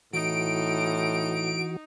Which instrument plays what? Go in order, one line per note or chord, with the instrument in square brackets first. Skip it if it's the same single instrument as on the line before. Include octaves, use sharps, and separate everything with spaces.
[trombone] A2 [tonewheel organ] E3 F#4 [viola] D#4 [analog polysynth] D7